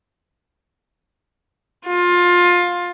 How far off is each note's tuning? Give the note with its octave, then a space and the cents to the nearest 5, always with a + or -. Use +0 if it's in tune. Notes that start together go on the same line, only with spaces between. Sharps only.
F4 +20